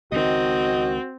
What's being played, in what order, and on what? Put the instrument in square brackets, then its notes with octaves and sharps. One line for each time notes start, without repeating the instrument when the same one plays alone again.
[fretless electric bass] C#2 D#3 [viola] C4 [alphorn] F#4 [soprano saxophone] D#5